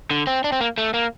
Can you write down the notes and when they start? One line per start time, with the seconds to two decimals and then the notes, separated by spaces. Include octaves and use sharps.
0.11 D3
0.27 C4
0.44 D4
0.52 C4
0.61 A#3
0.78 A3
0.94 A#3